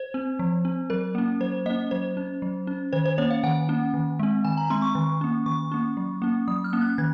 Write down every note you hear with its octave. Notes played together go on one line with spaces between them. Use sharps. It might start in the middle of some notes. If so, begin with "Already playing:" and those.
Already playing: C5
C4
F3
C4
F#3 A#4
A#3 C#4
F#3 C5
A#3 C#4 D#5
F#3 C5
C#4
F#3
C#4
D#3 C5
C5
A#3 C#4 C#5
F5
D#3 F#5
A#3 C#4
D#3
G#3 C4
D#3 G#5
A#5
G#3 C4 C6
C#6
D#3
A#3 C#4
D#3 C#6
A#3 C#4
F#3
A#3 C#4
F#3 D#6
F6
A#3 C#4
F#6
D#3 G#6